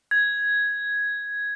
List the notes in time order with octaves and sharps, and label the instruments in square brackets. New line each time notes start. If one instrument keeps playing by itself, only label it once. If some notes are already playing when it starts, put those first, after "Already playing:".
[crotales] G#6